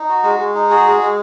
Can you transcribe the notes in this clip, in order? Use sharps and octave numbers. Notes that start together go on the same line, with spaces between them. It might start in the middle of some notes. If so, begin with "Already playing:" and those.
Already playing: D#4
F#4
G#3
G#3
D#4
F#4 G#4
G#3
G#3